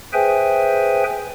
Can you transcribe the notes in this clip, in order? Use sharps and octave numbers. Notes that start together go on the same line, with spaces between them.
G#4 B4 C5 E5 G5 G#5